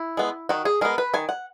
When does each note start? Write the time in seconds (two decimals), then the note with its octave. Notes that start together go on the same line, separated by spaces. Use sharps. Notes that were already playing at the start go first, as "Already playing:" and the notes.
Already playing: E4
0.17 G#3 B3
0.49 D#3 F#4
0.65 G#4
0.81 G#3 B3 A#4
0.98 B4
1.14 D#3 G#5
1.29 F#5